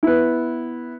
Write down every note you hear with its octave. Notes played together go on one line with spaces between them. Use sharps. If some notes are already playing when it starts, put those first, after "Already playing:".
B3 E4